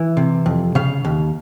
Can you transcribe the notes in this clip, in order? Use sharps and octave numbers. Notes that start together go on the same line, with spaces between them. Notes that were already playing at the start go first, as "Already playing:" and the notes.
Already playing: E3
C3
F2
C#3 F5
D#2